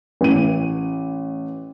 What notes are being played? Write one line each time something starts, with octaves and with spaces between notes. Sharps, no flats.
A1 D#7